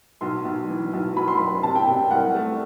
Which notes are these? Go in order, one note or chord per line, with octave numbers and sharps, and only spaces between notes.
B1 C6
B1
E3
B1
F#3 B5
C6
F#1 B5
C3 A5
G5
C3 G5
G5
C2 F#5
A3